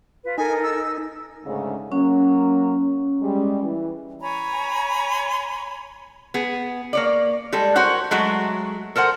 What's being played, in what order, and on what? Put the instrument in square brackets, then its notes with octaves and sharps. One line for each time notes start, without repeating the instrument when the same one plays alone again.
[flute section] F4 B4
[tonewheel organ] D#4 [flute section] A4 A#4 [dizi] G#5
[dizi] E6
[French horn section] D2 G#2 C#3
[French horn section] F#3 A#3 [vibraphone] C#4
[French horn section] G3 G#3
E3
[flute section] C#5 G#5 A#5 B5
[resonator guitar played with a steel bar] B3 G#4
A#3 C#5 D5
G3 G#3 A4
F#4 A#4 C5 C#5 F#5
F#3 G#3 A3 F#4
A4 A#4 C5 F#5